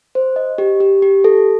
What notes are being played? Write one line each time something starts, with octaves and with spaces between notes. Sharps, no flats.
C5
D#5
G4
G4
G4
A4